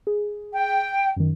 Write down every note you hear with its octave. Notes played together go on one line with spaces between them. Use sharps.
G#4
G5
F#2 D#3